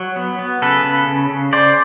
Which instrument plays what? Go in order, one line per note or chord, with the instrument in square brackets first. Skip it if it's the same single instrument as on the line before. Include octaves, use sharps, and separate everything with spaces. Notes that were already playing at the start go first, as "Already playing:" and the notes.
Already playing: [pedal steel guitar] F#3
B3
B3
C#3 A4 B4
C#3
C#3
C#3
C#3 C5 D5